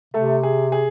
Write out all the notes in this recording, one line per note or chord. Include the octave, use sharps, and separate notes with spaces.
C3 A3 A4
G#4
G#4